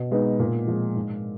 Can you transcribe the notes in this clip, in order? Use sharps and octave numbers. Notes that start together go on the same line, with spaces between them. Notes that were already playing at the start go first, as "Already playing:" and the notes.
Already playing: B2
G#3 B3 D#4
A#2
F3 G#3
G#2